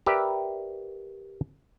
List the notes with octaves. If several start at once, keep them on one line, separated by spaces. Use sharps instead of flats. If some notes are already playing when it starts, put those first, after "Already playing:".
G4 A#4 B4 D5 E5